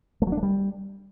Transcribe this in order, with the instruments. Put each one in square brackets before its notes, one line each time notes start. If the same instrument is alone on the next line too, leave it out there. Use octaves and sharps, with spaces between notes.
[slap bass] A3
F#3
D4
A3
G3